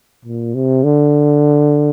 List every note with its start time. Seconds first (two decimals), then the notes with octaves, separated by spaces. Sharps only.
0.25 A#2
0.55 C3
0.84 D3